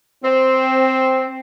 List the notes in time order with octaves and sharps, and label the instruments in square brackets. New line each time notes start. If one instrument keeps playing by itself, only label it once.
[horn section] C4